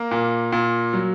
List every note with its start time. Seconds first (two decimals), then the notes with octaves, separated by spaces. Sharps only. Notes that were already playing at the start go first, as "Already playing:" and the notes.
Already playing: A#3 A#4
0.11 A#2
0.52 A#2
0.93 F#3